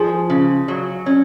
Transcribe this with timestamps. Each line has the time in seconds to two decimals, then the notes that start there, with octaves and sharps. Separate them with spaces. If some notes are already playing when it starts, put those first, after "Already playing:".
Already playing: F3 G#4
0.30 C#3
0.68 F#3
1.06 C#4